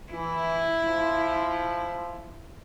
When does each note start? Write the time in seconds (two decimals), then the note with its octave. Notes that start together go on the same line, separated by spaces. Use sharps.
0.12 E3 E4
0.85 F3